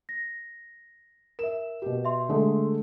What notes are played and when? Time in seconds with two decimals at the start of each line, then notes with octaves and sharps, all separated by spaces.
0.09 A#6
1.39 A#4 E5 E7
1.82 B2 G4
2.05 E5 C6
2.29 D3 G#3 A3